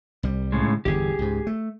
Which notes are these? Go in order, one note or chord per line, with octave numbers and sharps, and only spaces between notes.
C2 G3
A2 C#3 G#3
G1 E2 D3 G4 G#4
C#2 G#2
A3